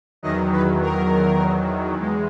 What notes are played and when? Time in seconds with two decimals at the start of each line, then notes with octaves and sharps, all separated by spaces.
0.23 E2 D#3 F#3 D#5
0.52 B4
0.82 A#4
1.99 E2 G#3